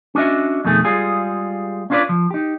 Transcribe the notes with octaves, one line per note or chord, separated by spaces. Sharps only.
C#4 D4 F#4 D#5 E5
F2 B2 D#3 A3 G#4
G3 G#3 F4 G#4
C#4 D4 F4 G#4 B4 D5
F3
D#4 G4